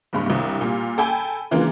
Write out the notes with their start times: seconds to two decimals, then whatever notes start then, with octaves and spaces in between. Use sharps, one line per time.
0.13 F#1 G2 B5
0.26 C2 G2
0.61 A#2 G3
0.98 A4 G5 G#5 B5
1.51 C#3 E3 G#3 A#3 D4 F4